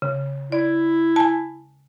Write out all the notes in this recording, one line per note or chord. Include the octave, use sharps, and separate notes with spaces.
C#3
E4 D5
G#5 A5